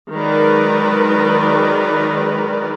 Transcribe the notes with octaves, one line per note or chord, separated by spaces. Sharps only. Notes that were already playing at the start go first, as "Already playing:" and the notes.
D#3 F#3 G#3 A#4 B4 D5